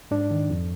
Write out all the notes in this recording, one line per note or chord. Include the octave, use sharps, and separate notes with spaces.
G#2 D4
D#3
F2